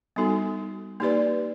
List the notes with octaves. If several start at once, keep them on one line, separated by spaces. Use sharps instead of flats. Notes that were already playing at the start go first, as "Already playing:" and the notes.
G3 B3 D#4 F#4 A4
A#3 D#4 G4 B4 D5